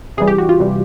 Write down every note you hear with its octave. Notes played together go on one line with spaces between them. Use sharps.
C3 E3 G3 G#4
G4
F#4
F4
C3 E3 G3